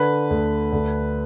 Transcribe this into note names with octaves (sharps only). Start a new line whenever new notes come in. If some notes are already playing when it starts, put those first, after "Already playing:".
Already playing: D3 B4
D2
D2